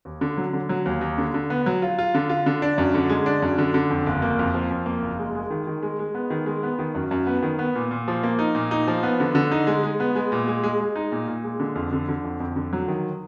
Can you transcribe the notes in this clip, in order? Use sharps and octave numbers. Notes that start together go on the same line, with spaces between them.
D#2
D3
F#3
D3
F#3
D#2
D#2
D3
D3
B3
F#3
F4
F4
D3
F4
D3
D4
F#2
D3
G#3
D4
F#2
D3
D3
F2
F#1
A#3
F2
F3
F2
A#3
F#1
G#3
G#3
D#3
D#3
G#3
G#3
B3
D#3
G#3
B3
D#3
F#2
F#2
B3
D#3
B3
A#2
A#2
F3
A#3
D#4
A#2
D#4
F3
B3
D3
D3
D#4
G#3
G#3
B3
G#3
A#2
G#3
G#3
G#3
D#4
A#2
A#2
G#3
D3
F2
D3
D3
F2
F2
D3
F#3
D#3